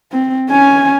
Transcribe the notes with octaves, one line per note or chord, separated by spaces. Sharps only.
C4
C#4 G#5